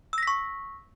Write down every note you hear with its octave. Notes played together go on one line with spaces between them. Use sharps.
C#6 E6 A#6 B6